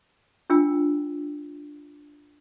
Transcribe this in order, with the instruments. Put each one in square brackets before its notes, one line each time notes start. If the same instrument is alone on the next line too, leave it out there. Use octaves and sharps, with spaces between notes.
[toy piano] D4 F4 G5 E6